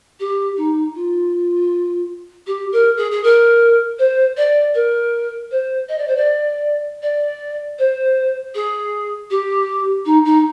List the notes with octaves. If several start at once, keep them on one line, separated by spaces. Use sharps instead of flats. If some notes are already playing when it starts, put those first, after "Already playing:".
G4
D#4
F4
G4
A#4
G#4
G#4
A#4
C5
D5
A#4
C5
D#5
D5
C5
D5
D5
C5
G#4
G4
D#4
D#4